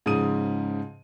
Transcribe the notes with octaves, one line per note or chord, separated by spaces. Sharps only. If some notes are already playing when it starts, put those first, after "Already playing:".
G#2 C#3 F3 D#6 D#7